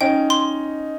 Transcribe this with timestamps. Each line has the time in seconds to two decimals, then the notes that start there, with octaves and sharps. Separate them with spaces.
0.01 C#4 D#4 G5
0.30 C6